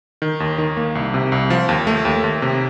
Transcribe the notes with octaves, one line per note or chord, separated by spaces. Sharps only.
D#3
D#2
D#3
A#3
C2
C3
C2
F3
D#2
A3
D#2
D#2
C3